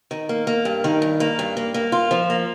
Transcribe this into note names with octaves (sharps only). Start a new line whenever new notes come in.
D#3
A#3
A#3
G2
D#3
G2
A#3
G2
A#3
A#3
F4
F3
A#3